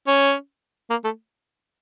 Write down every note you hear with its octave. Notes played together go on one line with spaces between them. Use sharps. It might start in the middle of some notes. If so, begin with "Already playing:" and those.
C#4
A#3
A3